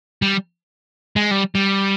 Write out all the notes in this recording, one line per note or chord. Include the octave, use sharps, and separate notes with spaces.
G3
G#3
G3
G3